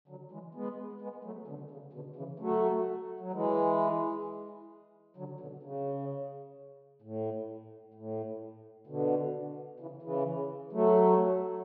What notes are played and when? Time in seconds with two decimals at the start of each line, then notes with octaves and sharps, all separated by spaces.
0.08 D3 F#3
0.31 E3 G#3
0.55 G#3 B3
1.01 G#3 B3
1.24 F#3 A3
1.47 B2 D3
1.71 C#3
1.93 B2 D3
2.16 C#3 E3
2.39 F#3 A3
3.20 F#3
3.32 E3 G#3
5.17 D3 F#3
5.40 B2 D3
5.63 C#3
7.02 A2
7.94 A2
8.87 B2 D3
9.80 C#3 E3
10.03 C#3 E3
10.72 F#3 A3